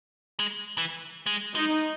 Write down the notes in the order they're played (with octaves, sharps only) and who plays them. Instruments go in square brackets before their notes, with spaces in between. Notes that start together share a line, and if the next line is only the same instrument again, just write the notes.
[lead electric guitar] G#3
E3
G#3
[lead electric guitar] G#3 [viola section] D#4